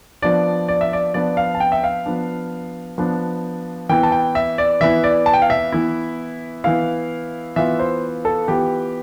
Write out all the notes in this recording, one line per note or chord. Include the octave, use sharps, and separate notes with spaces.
F3 B3 D4 D5
D5
E5
D5
F3 B3 D4 D5
F5
A5
G5
E5
F5
F3 B3 D4
F3 B3 D4
E3 B3 E4 G5
A5
G5
E5
D5
E3 B3 E4 E5
D5
A5
G5
F5
E5
E3 B3 E4
E3 B3 E4 F5
E3 B3 F4 E5
C5
A4
E3 B3 F4 G4